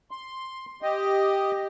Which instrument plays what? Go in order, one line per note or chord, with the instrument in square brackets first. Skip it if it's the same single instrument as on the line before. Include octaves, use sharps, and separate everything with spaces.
[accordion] C6
G4 D#5